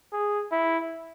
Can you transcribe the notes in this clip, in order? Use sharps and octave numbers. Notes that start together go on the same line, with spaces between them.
G#4
E4